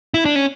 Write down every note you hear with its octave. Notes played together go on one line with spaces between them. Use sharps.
E4
D4
C#4